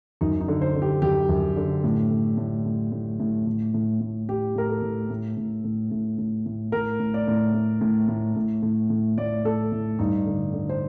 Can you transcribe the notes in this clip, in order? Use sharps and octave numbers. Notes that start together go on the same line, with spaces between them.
F#2 D#4
D#4
D3
C5
D3
G4
F#2 G4
F#2
D3
A2
A2
A2
A2
A2
A2
A2
A2
A2
A2 G4
A2 A#4
A4
A2
A2
A2
A2
A2
A2
A2
A2 A#4
A2
D5
A2
A2
A2
A2
A2
A2
A2
A2 D5
A2 A4
A2
G2 D#4
D3
D3
C5